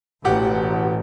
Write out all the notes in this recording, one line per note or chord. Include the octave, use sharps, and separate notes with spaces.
E1 A1 G4 F#5